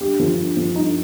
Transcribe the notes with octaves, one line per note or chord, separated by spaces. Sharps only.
G2 G4
F3
G2
F3
G2 D#4